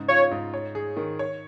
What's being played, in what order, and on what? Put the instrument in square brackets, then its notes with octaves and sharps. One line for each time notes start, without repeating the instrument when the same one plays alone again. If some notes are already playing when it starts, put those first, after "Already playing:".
Already playing: [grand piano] G#2 C#3
[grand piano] F4 [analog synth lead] C#5
[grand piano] G#2
C#5
G#4
D#3
C#5